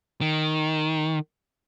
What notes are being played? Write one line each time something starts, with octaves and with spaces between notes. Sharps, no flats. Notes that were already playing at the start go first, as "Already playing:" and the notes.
D#3